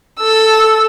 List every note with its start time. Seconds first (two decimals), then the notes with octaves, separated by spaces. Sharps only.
0.20 A4 E6